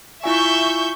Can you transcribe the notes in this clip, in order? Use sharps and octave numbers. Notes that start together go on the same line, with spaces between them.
E4 F4 E5 G#5 C#6 G6